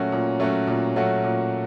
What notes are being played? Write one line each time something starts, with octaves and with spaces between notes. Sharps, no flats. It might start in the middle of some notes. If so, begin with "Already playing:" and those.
Already playing: A#2 F#3 A3 C#4 F#4
A#2
F#3 A3 C#4 F#4
A#2
F#3 A3 C#4 F#4
A#2